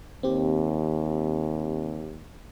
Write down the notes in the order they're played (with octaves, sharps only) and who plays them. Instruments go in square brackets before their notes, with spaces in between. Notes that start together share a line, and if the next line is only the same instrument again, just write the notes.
[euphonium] D#2 [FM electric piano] C4 G4